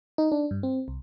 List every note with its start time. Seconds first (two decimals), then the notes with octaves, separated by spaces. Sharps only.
0.18 D#4
0.32 D4
0.51 G2
0.63 C4
0.88 C2